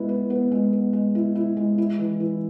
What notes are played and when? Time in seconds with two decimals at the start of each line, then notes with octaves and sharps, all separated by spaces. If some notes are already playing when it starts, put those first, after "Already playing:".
Already playing: G#3 B3 E4
0.09 B4
0.30 B3
0.51 G#3
0.73 B3
0.93 G#3
1.15 E4
1.35 E4
1.57 G#3
1.78 E4
1.99 E3
2.20 E3